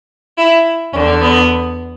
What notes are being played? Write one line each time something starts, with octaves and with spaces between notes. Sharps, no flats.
E4
E2 D3 C#4
B3